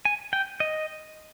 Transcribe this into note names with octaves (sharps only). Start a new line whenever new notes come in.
G#5
G5
D#5